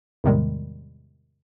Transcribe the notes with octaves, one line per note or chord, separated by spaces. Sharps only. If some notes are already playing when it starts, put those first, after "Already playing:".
E2 A2 C3 D#3 G3 G#3